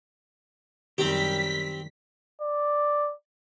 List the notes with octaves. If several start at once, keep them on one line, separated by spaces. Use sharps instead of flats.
F#2 D#3 G3 C4 G4 B6
D5